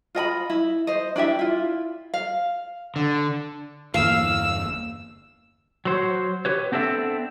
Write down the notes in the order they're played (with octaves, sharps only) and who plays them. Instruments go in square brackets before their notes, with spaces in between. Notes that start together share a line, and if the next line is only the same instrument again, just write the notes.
[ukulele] F4 D#5 G5 B5
E4
C5 D#5
D4 E4 G4 E5
E4 F4
F5
[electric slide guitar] D3
[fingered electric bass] G1 E2 A#3 [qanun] F5 [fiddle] E6
[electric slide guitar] F#3 C5 C#5
G4 B4 C#5
B3 C4 D4 A4 E5